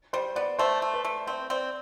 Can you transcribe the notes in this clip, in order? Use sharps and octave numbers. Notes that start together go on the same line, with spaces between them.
G3 C5
B3 D5
A3 C5
A3
B4
A3
C4 C5
C4 D5